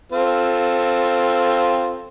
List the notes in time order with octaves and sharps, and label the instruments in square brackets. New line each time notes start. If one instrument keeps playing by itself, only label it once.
[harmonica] C4 F4 A4